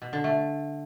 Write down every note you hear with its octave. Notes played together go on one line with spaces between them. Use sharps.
B2
D3
A3